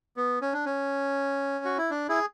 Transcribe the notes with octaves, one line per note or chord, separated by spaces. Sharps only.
B3
C#4
D4
C#4
F#4
E4
D4
E4 G#4